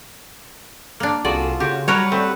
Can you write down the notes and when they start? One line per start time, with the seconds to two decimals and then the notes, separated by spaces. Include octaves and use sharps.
1.00 A#3 D4
1.25 C2 F4 F#4 G#4 A4 D5
1.60 C#3 F#4 G4
1.88 F#3 G3 F#4 A#4 B4 C#5 F#5
2.12 A3 C4